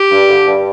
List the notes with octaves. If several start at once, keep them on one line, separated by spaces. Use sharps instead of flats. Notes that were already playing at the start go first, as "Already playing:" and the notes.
Already playing: G4
G2
D3
G2